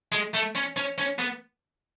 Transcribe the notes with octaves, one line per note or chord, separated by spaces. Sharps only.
G#3
A3
C#4
C#4
C#4
B3